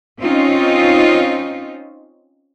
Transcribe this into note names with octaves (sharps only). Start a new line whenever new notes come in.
C4 C#4 D#4 F4